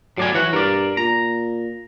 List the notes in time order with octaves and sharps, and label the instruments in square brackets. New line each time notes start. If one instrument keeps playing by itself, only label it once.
[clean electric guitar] A2 D5 G#5 [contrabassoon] F#3
[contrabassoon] E3 [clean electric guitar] F#4 C#5 F#5
[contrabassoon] G2 [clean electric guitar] A#4 D5
[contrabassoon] A#2 [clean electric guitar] A#5